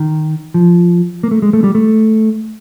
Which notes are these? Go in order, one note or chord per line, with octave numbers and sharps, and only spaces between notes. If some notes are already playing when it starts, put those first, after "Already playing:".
Already playing: D#3
F3
A#3
A3
G#3
A3
G3
A3